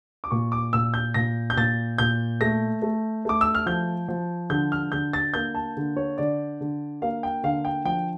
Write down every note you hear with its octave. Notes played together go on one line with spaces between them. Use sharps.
D6
A#2 C#6
D6
A#2 E6
G6
A#2 A#6
G6
A#2 A6
A#2 G6
A3 A#6
A3
A3 D6
E6
F6
F3 G6
F3
D3 G6
F6
D3 G6
A6
A#3 G6
A5
D3
C#5
D3 D5
D3
A#3 F5
G5
D3 F5
G5
F3 G5